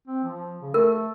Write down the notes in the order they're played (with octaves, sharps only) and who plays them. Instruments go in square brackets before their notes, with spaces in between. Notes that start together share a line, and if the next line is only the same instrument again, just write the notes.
[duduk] C4
F3
C#3
[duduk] A3 [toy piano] A#4